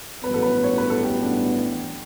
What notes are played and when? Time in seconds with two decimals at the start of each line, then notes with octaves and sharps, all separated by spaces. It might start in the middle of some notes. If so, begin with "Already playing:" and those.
0.24 A1 G2 F#3 B3 B4
0.34 A4
0.43 B4
0.64 C#5
0.78 B4
0.90 A4
1.03 G4
1.23 D4